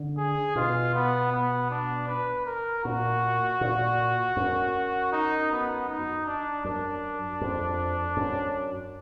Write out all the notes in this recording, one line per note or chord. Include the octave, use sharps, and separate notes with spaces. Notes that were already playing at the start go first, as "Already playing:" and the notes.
Already playing: D3
G#4
B2 F4
B3
B3
D4
B4
A#4
A#2 F#4
A#2
F#2
D#4
B3
D#4
D4
F#2 D4
F2
F#2